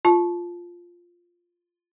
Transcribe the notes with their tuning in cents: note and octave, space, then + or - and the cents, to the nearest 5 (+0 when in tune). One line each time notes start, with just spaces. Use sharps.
F4 +0 A5 -20